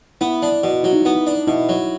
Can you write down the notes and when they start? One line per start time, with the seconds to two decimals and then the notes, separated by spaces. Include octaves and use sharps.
0.21 B3 E4
0.42 D4
0.64 B2
0.83 F#3 E4
0.93 D#4
1.02 B3 E4
1.27 D4
1.47 B2 E4
1.69 F#3